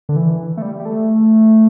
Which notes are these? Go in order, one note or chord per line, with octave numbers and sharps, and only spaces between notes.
D3
E3
A3
G3
G3
A3